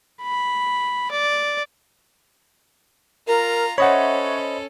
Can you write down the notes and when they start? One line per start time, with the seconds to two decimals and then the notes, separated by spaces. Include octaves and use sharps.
0.23 B5
1.11 D5
3.27 F4 A#4 A#5
3.78 C#4 A4 C5 C#5 D#5 E5 F#5 B5